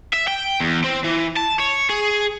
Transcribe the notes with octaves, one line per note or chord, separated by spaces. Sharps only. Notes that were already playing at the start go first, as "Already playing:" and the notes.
E5
G5
E2
C4
E3
A5
C#5
G#4